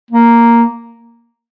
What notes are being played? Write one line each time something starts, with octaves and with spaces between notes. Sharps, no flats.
A#3